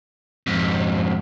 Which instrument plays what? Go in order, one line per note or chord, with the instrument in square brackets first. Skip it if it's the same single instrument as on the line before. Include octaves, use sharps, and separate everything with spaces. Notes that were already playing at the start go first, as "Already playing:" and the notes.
[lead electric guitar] F2 G#2